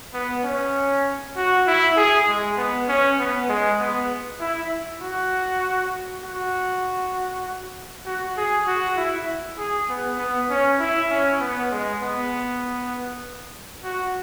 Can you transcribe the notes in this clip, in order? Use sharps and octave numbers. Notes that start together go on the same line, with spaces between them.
B3
C#4
F#4
E4
G#4
G#3
B3
C#4
B3
G#3
B3
E4
F#4
F#4
F#4
G#4
F#4
E4
G#4
B3
B3
C#4
E4
C#4
B3
G#3
B3
F#4